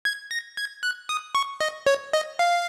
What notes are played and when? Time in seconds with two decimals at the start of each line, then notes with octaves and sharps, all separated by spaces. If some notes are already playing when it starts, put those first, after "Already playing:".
0.05 G#6
0.31 A#6
0.57 G#6
0.83 F#6
1.09 D#6
1.35 C#6
1.61 D#5
1.87 C#5
2.13 D#5
2.39 F5